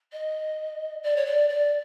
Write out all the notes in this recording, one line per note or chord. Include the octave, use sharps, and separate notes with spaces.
D#5
D5
C#5
D5
D5